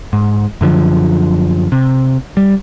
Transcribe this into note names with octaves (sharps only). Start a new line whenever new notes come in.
G#2
F#2 D3 F3
C3
G3